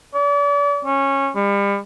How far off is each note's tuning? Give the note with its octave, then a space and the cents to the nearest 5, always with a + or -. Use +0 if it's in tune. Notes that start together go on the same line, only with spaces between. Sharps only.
D5 -40
C#4 -15
G3 +35